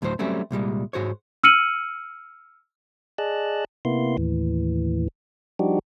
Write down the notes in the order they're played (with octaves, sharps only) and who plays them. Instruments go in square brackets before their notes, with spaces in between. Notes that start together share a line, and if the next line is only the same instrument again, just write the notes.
[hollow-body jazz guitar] D2 A2 F#3 A#4 C5
F#3 G3 A3 C4 C#4
C2 A#2 G3 G#3
G#2 F#4 C5 C#5
[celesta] E6 F6 C#7 D#7 F#7
[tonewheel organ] G#4 D5 D#5 A5 F#6
C3 A#3 B3 E4 C6
D#2 A2 E3
F3 G3 D4 D#4 F#4 G4